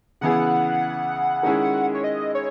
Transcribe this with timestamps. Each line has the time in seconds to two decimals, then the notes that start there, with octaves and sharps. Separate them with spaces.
0.21 C#3 E3 B3 E4 G#4 F#5
1.43 D#3 G#3 C#4 E4 G#4
1.95 C#5
2.04 D#5
2.35 C#5